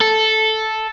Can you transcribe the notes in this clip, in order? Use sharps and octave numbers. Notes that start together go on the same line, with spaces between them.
A4